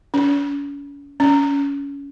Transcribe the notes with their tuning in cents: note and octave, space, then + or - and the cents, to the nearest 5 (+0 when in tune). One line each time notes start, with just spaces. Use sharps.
C#4 +40
C#4 +20